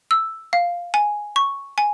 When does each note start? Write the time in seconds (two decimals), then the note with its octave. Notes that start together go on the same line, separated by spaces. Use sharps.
0.11 E6
0.53 F5
0.94 G#5
1.36 C#6
1.78 G#5